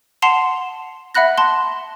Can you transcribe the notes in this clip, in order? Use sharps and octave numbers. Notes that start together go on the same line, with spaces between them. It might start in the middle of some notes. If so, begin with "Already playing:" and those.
F#5 A5 C6 C7 E7 F7
E5 F#5 B5 F#6 A#6
A5 C6